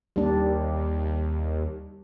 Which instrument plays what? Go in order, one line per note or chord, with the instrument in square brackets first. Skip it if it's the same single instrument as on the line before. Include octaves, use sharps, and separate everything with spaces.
[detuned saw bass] D#2 [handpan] G3 D4